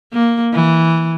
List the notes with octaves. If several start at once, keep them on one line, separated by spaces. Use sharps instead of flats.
A#3
E3